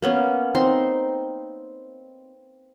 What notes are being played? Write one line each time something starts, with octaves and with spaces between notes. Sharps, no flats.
A#3 B3 C#4
C4 D#4 C6